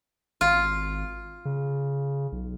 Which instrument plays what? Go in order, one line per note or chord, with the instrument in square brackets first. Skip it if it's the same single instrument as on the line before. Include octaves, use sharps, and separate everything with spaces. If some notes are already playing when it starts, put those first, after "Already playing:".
[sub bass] G#1 [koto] F4
[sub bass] C#3
B1